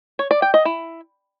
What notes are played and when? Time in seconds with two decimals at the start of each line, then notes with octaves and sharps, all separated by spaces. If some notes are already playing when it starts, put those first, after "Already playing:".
0.19 C#5
0.31 D5
0.42 G5
0.54 D#5
0.65 E4